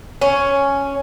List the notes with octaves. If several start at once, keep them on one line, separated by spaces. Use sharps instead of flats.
C#4